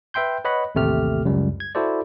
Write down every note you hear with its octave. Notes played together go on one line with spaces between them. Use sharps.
B4 E5 G5 C6 G6
B4 C#5 D#5 F#5 B5
A1 D#2 C3 A3 G4 F6
C#2 F#2 G3
G#6
E4 F#4 A4 C5 D5